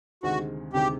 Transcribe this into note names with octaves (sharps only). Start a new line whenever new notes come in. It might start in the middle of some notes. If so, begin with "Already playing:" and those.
D2 C3 D#3 G#3 C4 F#4
D2 C3 D#3 G#3 C4 G4